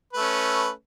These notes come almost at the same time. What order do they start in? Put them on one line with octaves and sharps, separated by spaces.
B4 A3 C#4